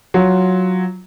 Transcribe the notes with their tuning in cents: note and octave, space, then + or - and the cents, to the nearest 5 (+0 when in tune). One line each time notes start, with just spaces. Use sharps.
F#3 +0 F4 +0